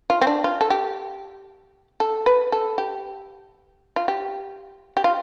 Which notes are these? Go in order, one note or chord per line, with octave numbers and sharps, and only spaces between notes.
F4
C4
D4
F4
A4
G4
A4
B4
A4
G4
F4
G4
G4
F4